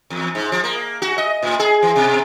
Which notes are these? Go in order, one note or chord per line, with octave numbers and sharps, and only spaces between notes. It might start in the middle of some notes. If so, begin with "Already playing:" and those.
E2
G#2
F3
A#3
F#4
D#5
A2
G#4
E3
B2